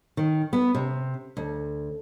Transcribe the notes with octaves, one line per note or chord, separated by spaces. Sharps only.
D#3
B3
C3
D2